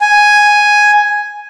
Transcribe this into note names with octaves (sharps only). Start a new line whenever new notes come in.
G#5